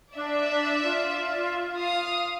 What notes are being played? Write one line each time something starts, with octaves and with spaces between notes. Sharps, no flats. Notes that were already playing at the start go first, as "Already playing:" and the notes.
D4 D5 E5
F4
F5 D#6